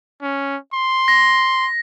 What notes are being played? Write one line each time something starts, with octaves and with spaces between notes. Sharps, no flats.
C#4
C6
A#6